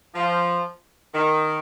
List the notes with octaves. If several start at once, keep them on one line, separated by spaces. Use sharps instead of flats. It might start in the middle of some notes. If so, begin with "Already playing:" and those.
F3
D#3